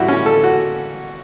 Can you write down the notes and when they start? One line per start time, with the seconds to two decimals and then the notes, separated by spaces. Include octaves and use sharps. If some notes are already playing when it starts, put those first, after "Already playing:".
Already playing: A1 G3 E4 F#4 G4
0.08 C#4
0.26 A4
0.44 F#4